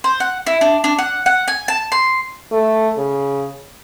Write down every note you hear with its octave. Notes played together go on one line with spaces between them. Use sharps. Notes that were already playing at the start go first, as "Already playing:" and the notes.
C5
F#5
E4
D4
D4
F#5
F#5
G#5
A5
C6
A3
C#3